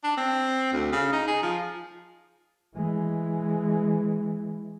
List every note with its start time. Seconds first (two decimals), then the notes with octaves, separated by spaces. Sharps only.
0.03 D4
0.17 C4
0.72 D2
0.92 C#3
1.12 D#4
1.27 G#4
1.42 F3
2.75 E3 G#3